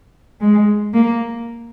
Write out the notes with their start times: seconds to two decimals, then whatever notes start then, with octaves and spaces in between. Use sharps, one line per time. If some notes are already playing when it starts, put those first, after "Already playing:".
0.41 G#3
0.94 A#3